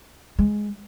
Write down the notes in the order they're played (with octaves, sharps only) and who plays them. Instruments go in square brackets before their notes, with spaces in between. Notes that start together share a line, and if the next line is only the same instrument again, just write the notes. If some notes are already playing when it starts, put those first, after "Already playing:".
[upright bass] G#3